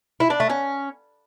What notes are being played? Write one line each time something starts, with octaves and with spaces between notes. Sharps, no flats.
E4
D4
A3
C#4